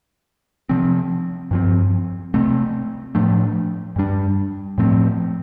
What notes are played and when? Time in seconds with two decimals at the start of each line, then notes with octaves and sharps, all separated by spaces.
0.69 C3 F3 C4
1.51 G2 F3 C4
2.34 C3 A3 C4
3.15 A2 F3 A3 D4
3.96 G2 G3 D4
4.78 A2 F3 A3 C4